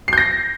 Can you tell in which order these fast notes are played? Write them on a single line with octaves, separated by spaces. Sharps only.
C7 G6 A#6